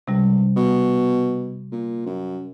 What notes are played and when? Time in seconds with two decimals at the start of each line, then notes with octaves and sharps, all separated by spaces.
0.08 C#2 C3 G3
0.56 B2
1.72 A#2
2.06 F#2